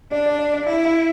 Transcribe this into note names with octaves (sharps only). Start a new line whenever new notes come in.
D4 D5
D5
D5
D5
E4 E5
E5